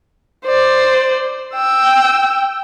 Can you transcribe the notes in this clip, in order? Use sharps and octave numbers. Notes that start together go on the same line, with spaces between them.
C5 D5
G5 E6